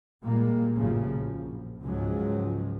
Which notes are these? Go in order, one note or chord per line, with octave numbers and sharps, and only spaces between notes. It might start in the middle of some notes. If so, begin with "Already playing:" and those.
A#2 G3 G#3 A#3
A1 F#2 C#3 F3
A#1
C#2 G#2 F3 F#3 G#3